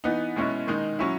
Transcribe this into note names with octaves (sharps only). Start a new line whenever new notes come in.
E3 B3 D#4
B2 G#3 C#4 E4
D#3 G#3 D#4
F#3 C#4 E4